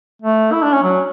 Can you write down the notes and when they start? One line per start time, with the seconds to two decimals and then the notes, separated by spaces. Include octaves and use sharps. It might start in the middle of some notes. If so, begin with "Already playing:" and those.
0.22 A3
0.52 E4
0.62 D4
0.73 C#4
0.83 F#3